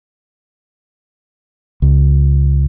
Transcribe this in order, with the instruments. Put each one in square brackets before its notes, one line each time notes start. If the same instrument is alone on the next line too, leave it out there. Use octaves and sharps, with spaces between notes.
[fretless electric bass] C#2